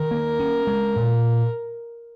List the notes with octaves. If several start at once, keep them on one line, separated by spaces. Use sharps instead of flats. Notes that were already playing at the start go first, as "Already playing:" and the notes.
Already playing: D#3 A#4
A#3
C#4
G#3
A#2